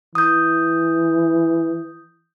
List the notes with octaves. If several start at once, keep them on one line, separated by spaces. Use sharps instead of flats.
E3 D#6 G6